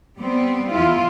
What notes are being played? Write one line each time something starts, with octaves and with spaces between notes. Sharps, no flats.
G3 B3 C4
E2 E4 F4